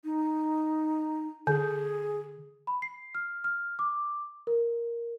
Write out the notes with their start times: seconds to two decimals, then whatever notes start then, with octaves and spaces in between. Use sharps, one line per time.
0.04 D#4
1.47 D3 G#4
2.67 B5
2.82 C7
3.15 F6
3.44 F6
3.79 D6
4.47 A#4